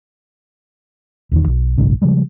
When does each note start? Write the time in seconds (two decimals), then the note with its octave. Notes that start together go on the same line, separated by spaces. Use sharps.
1.31 D#1 E2 D3 D#3
1.47 B1
1.78 F#1 B1 G#2 C#3
2.02 C#3 F3 G3 G#3